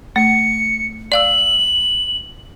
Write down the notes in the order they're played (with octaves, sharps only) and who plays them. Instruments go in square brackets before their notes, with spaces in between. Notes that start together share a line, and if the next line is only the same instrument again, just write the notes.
[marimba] A3 [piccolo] C#7
[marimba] D5 F5 E6 [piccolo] F#7